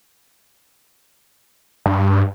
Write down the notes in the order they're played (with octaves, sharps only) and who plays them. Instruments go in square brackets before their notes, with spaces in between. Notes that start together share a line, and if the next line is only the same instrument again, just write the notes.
[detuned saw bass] G2